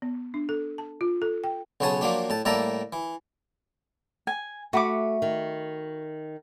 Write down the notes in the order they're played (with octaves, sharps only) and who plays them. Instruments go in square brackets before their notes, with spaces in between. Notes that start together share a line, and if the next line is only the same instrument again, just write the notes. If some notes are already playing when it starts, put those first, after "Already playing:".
[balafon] B3
D4
A4
A5
F4
A4
G5
[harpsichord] B1 C#3 B3 C#5 A5 D#6
F3 F#3 A#3 D4 G4
A2 A5
A2 G3 A#3 E5 A5 A#5
E3
[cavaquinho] G#5
[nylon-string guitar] A3 [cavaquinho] F#4 B5 D6
[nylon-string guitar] D#3